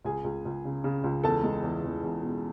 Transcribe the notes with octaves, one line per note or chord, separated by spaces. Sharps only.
C#2 G#4 G#5
C#2
C#2
C#3
C#3
C#2
E2 A4 A5
G#3
E2
E2
E2
B2